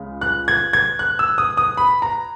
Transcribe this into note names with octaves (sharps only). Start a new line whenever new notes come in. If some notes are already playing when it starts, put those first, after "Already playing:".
Already playing: C#2 C#3 G#3
F#6
G#6
G#6
F#6
E6
D#6
D#6
B5
A#5